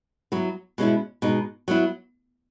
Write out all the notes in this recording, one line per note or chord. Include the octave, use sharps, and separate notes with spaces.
F#3 B3 E4
B2 G#3 C#4 E4
B2 G#3 D#4
F#3 B3 E4